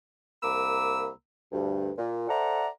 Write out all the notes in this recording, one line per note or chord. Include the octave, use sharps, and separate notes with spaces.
C2 A#3 A#5 B5 D6 E6
D2 G2
A#2
A4 C5 D5 E5 F#5 A#5